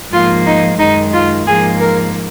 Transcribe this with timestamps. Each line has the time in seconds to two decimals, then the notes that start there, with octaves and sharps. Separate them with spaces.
0.12 G#2 F3 A#3 F4
0.46 D#4
0.78 F#2 D#3 G#3 D#4
1.13 F4
1.46 G#2 F3 A#3 G#4
1.80 A#4